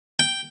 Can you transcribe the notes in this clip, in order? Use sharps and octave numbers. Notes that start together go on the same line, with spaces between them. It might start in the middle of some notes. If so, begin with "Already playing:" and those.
G5